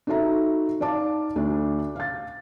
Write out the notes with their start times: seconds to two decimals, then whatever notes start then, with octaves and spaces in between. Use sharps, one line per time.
0.07 D#4 F#4 A4 E5 A#5
0.80 D#4 D5 F5 A5 D6
1.36 D2 D3 D4
1.96 F5 A6